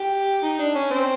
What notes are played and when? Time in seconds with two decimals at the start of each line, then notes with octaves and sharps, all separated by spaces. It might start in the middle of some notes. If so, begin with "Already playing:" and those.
Already playing: G4
0.43 D#4
0.59 D4
0.75 C#4
0.91 C4